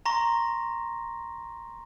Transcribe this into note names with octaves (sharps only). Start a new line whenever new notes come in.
A#5 C6 C#6 A#6